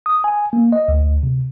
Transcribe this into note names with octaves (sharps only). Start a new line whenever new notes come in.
D#6
G#5
A#3
D#5
D2
C3